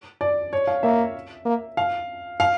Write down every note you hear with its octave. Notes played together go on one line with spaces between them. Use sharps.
D5
C#5
F5
A#3 E5
A#3
F5
F5